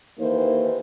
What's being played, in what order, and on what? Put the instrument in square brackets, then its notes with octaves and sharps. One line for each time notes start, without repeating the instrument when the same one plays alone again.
[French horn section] D#2 D#3 E3 A#3 D#4 C5